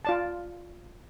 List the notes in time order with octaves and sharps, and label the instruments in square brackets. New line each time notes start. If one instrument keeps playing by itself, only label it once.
[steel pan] F4 D5 A5